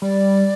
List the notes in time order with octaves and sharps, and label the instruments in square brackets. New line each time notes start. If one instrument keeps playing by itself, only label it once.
[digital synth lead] G3 [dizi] D5